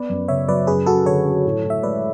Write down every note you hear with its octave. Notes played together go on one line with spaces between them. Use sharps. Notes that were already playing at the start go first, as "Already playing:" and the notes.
Already playing: B3 B4 D5
F#2
C#3 C#5 E5
F#3 B4 D5
F#2 G#4 B4
F#2 F#4 A4
D3 A4 C#5
F#3
A2
A2
E5
G#3 B4 D5